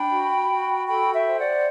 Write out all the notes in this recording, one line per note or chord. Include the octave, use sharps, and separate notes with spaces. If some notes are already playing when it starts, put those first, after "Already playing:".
Already playing: D4 G5 B5
F#4
F#4
A4 G5 B5
E5 G5
C5
D5 F#5